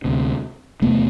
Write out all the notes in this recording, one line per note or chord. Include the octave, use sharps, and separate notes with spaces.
D2 C3
E2 C3 A3 B3